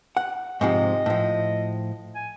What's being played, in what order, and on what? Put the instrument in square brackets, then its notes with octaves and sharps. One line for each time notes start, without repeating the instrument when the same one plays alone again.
[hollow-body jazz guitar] F#5
[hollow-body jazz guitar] G#2 C3 F3 [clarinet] D#5
[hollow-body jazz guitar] A2 F3
[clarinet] G#5